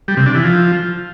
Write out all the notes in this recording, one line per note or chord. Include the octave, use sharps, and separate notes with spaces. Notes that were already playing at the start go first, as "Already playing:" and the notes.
G3
C3
D4
E3
F3